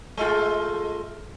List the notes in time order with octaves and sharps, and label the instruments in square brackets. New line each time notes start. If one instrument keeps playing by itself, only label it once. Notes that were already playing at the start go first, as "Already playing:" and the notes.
[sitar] G#3 A3 F4